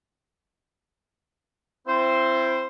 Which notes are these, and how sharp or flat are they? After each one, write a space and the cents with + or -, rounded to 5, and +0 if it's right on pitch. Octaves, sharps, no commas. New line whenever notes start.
C4 +0 E4 +30 C5 +0